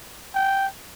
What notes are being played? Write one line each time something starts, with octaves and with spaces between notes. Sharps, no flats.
G5